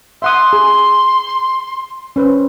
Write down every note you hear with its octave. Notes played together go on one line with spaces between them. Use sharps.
E5 F#5 C6 D#6
G#4
C#4 B4 C5